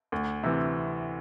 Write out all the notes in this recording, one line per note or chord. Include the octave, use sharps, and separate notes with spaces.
D2
C3 E3